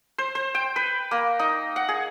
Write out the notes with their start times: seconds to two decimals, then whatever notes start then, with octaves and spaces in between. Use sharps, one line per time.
0.18 C5
0.35 C5
0.55 G5
0.76 B4
1.11 A#3
1.39 D#4
1.76 F#5
1.89 G#4